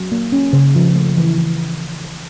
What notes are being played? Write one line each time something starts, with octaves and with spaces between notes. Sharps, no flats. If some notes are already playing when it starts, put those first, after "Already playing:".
Already playing: F#3
A#3
C#4
C#3
F3
A3
E3
E3